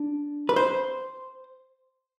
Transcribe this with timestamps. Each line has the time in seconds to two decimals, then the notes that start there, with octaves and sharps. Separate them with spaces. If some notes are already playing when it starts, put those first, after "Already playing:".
Already playing: D4
0.49 B4
0.56 C5